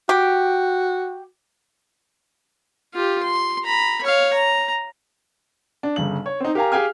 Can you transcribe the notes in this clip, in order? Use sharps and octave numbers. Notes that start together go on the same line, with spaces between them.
F#4 G4
F4 G4
C6
A#5 B5
C#5 F5
A#5
D4
G1 C#3 F#7
C#5
C4 D#4
G4 A#4 F5 G#5 A#5
G4 G#4 F5 G5 G#5 F6